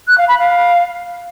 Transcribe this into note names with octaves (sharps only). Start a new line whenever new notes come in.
F#6
F5
B5
F5